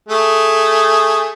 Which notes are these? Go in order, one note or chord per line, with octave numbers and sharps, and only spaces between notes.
A3 G#4